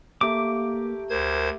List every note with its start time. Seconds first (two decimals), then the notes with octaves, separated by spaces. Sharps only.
0.21 A3 A#3 G4 A#5 D6
1.10 D2 A#4 C5 G#6